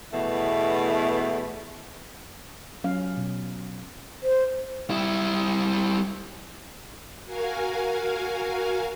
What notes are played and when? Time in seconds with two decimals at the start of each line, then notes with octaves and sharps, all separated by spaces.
0.12 E2 B2 A3 E4
2.84 F#3 C#4 F5
3.17 B2
4.23 C5
4.90 G3 E4
7.26 F#4 A#4 F5 G#5